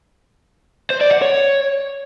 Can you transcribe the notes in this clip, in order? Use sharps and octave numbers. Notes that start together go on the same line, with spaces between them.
C5
D5
F#5
C#5